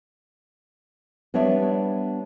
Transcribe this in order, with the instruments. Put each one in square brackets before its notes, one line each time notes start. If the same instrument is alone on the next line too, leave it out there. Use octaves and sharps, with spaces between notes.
[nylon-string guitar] G3 B3 D4 C#5 E5